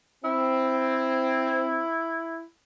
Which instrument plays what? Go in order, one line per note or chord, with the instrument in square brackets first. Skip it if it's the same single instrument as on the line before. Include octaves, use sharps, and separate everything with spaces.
[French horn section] C4 [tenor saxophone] E4